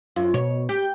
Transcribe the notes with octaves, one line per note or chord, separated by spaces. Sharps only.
F#2 F4
B2 C#5
G4 G6